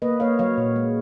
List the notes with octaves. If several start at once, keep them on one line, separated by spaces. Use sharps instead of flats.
A#3 B4 D#5
A#3 C#5 F5
F#3 C#5 F5
A#2
G#3